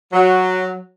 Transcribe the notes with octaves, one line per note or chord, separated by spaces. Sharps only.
F#3